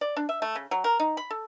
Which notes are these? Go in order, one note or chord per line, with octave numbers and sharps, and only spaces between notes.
D5
D4
E5
A3
C#3
F#3
A#4
D#4
B5
A4